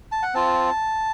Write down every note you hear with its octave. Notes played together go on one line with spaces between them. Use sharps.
A5
F#5
C4 F4 A5